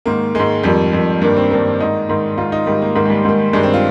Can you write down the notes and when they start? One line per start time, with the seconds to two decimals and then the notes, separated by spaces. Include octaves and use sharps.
0.06 G#2 D#3 A#3
0.35 G#2 D#3 G#3
0.63 F2 D#3 G3
0.93 F2 D#3
1.22 G2 D#3 A#3
1.37 C4
1.51 G2 D#3 A#3
1.80 G#2 D#3 D#4
2.09 G#2 D#3
2.38 G#2 D#3 F4
2.52 D#4
2.67 G#2 D#3 G3
2.82 A#3
2.95 G#2 D#3 A#3
3.05 G#3
3.10 G3
3.25 G#2 D#3
3.53 G2 D#3 G#3
3.63 C4
3.74 F4